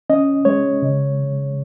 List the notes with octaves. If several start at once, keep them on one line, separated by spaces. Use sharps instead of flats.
C#4 D#5
G#3 C#5
C#3